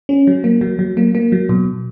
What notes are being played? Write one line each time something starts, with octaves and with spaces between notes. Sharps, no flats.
C#4
F#3
A#3
F#3
F#3
A#3
A#3
F#3
B2